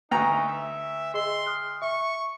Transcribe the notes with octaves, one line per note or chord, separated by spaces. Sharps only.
D2 D#4 B4 A#5 C#6
E5
G#4 D#5 C6 E6
D#6 F6 F#6
E5 C#6